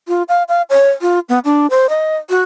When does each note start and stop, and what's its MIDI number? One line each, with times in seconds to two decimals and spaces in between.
0.08 0.23 65
0.29 0.43 77
0.48 0.62 77
0.70 0.89 73
1.01 1.19 65
1.29 1.39 59
1.44 1.67 62
1.70 1.86 72
1.89 2.16 75
2.30 2.43 66